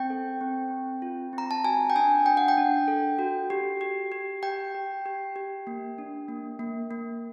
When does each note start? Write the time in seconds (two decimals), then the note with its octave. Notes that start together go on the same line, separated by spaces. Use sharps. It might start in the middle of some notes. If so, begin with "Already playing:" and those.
Already playing: C4 G5
0.10 A4
0.41 C4
0.71 C4
1.02 F4
1.33 C4
1.38 A#5
1.51 A5
1.64 F#4 G#5
1.90 G5
1.96 D4 G#5
2.26 D4 G5
2.37 F#5
2.48 G5
2.57 D4
2.88 A4
3.19 F#4
3.50 G4
3.81 G4
4.12 G4
4.43 G4 G5
4.75 G4
5.06 G4
5.36 G4
5.67 A#3
5.98 D4
6.28 A#3
6.59 A#3
6.91 A#3